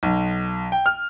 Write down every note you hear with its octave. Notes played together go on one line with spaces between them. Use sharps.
B1
G5
F6